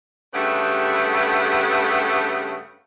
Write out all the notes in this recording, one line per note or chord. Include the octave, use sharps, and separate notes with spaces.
G2 C#3 A3 G4 B4 F#5